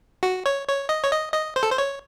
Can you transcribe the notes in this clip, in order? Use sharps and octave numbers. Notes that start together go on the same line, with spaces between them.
F#4
C#5
C#5
D#5
C#5
D#5
D#5
C5
A4
C5
C#5